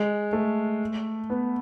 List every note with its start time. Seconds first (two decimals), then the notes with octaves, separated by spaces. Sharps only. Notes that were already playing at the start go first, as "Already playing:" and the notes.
Already playing: G#3
0.33 A3
1.30 B3